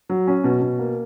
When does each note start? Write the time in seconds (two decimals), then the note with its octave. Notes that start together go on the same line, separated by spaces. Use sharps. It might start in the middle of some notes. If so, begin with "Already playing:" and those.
0.09 F#3
0.27 C#4
0.44 B2
0.62 B2
0.79 A#3